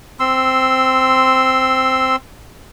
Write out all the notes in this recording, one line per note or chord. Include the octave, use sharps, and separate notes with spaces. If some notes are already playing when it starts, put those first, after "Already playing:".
C4 C6 E6